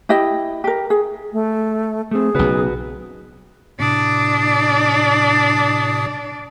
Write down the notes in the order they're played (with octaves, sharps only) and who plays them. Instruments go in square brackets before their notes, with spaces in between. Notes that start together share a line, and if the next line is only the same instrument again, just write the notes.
[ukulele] E4 G4 D#5 G5
G4 A#4
G#4
[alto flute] A3
[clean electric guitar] A3 C4 [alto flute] G#4
[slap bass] B1 C#3 [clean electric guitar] F#4 B4
[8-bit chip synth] A2 C3 D#6 [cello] D4 D5